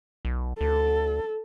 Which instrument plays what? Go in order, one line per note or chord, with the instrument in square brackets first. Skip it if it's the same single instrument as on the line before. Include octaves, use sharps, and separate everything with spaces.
[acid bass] B1
[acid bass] D2 [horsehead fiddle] A4